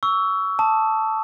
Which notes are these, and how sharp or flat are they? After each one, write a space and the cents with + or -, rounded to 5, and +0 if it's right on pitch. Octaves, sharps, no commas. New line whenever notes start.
C#6 +25 E6 +0
A5 +0 D#6 +0